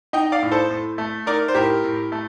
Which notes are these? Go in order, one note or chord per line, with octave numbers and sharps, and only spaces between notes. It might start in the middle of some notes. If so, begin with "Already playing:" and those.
D#4 D#5 G5
D5 F5
A2
A4 C5
A2
A3
D#4 A#4 D5
C5
A2 G4 A#4
A2
A3